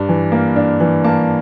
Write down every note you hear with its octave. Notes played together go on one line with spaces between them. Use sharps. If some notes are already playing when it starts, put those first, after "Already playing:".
Already playing: G2 D4
E3
A#3
D4
E3
A#3 A5